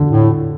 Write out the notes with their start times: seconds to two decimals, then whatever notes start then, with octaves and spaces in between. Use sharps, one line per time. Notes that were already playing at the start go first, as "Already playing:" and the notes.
Already playing: D3
0.10 A2